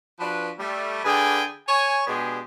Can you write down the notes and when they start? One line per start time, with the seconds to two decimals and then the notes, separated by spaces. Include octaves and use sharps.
0.20 F3 D4 F#4 B4
0.59 G3 A3
1.05 D3 G#4 B4 D5 G5 G#5
1.68 C#5 G#5
2.07 B2 G#3 B3 D4 G4 G#4